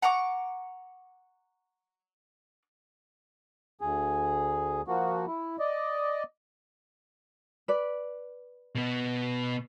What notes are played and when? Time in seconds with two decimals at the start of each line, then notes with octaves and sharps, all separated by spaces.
0.02 F#5 A#5 C#6 D6
3.81 D2 G#4
4.88 F3 A#3 F#4
5.27 E4
5.59 D5 D#5
7.68 B4 D5
8.75 B2 B3